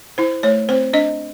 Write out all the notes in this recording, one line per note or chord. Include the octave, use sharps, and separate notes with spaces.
E4 C5
A3 C#5
C4 C5
D4 D#5